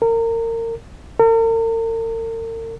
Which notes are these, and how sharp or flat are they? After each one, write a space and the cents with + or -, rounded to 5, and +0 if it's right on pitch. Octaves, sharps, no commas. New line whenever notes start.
A#4 -30
A#4 -45